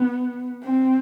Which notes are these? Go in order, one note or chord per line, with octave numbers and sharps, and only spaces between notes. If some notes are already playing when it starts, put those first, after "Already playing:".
Already playing: B3
C4